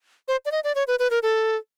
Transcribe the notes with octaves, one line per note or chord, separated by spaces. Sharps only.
C5
D5
D#5
D5
C#5
B4
B4
A#4
A4